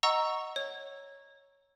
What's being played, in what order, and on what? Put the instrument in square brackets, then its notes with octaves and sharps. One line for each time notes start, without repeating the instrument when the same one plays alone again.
[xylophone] D#5 F#5 A#5 C#6 E6
C#5